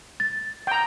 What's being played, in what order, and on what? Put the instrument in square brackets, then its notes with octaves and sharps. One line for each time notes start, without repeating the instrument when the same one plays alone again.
[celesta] A6
[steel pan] G5 A#5